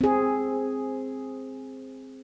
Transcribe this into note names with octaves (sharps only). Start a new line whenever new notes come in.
C4 G#4